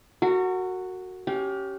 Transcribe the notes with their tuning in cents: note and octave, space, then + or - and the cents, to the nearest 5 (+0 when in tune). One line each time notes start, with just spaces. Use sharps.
F#4 +0 A#4 -40
C#4 +0 G4 -15 F5 +30